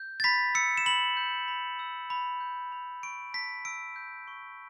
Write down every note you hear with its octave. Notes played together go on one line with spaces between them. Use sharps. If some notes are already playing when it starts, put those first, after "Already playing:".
Already playing: G6
A6
B5 B6
E6 C#7
E7
B5 F#7
G6
B5
E6
B5
G6
B5
C#6 D7
A5 B6
E6 D7
G6
C#6